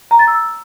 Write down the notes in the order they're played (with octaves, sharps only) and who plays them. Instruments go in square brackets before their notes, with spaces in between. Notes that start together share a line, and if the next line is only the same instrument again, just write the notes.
[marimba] A#5
A6
E6